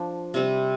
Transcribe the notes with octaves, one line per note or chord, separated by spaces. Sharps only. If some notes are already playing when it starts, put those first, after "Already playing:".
Already playing: F3 D4
C3 G3 C4